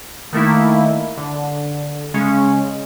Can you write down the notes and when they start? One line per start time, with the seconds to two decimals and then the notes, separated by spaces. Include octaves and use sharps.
0.33 D#3 A3 A#3 E4
1.17 D3
2.14 C#3 G#3 C#4